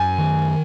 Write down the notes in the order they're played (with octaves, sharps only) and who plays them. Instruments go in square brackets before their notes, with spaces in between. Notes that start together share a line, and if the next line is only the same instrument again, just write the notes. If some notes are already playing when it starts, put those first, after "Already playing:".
Already playing: [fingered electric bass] F#2 [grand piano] G#5
[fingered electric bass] D#3